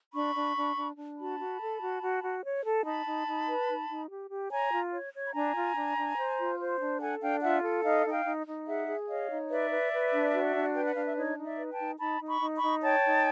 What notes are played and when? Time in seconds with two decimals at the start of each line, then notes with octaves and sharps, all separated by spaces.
0.14 D4 B5 C#6
0.35 D4
0.56 D4
0.76 D4
0.97 D4
1.18 F#4 A5 B5
1.39 F#4
1.60 A4
1.80 F#4
2.01 F#4
2.22 F#4
2.43 C#5
2.64 A4
2.84 D#4 A5 B5
3.05 D#4
3.27 D#4
3.48 B4
3.68 D#4
3.89 D#4
4.10 G4
4.30 G4
4.51 C#5 G#5 A#5
4.72 F4
4.92 C#5
5.13 C#5
5.28 B5
5.34 D4 G#5 A#5
5.55 F4
5.75 D4
5.97 D4
6.17 C5
6.38 F4
6.59 C5
6.80 D4
7.00 A4 F#5 G#5
7.21 D4 F5 G5
7.41 F4 E5 F#5
7.63 A4
7.83 D#4 D#5 F5
8.04 D#4
8.11 F5 G5
8.26 D#4
8.46 D#4
8.67 G#4 E5 F#5
8.88 G#4
9.08 C#5 D#5 F5
9.30 D#4
9.49 B4 D5 E5
9.70 B4
9.92 B4
10.13 D4
10.33 F#4
10.55 D4
10.74 B4 G5
10.85 F#5
10.95 D4 F5
11.06 E5
11.16 D#4 C#5 D#5
11.37 D#4
11.44 D5 E5
11.58 B4
11.71 G5 A5
11.78 D#4
11.99 D#4 A5 B5
12.20 D#4
12.27 B5 C#6
12.41 D#4
12.55 B5 C#6
12.62 D#4
12.82 C#5 G5 A5
13.04 D#4